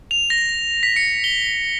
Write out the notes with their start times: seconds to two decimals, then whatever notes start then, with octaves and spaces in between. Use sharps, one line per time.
0.11 F7
0.30 A#6
0.83 B6
0.96 C#7
1.24 G7